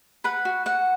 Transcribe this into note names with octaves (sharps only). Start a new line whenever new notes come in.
B4 F#5 B5
F#4
F#4 F#5